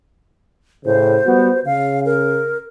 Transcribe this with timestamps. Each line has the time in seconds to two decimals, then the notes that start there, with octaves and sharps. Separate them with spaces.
0.85 A2 C#3 C5
1.26 G3 B3 F#4
1.66 C#3 F5
2.05 A#4